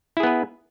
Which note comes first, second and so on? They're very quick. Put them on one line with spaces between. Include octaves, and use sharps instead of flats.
E4 G#4 B3 B4